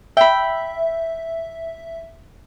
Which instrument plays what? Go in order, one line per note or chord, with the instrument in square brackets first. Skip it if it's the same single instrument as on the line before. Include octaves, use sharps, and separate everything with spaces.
[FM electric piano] E5 [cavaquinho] G5 B5